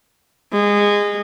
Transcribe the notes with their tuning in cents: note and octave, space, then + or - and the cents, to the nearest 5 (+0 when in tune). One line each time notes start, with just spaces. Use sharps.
G#3 -20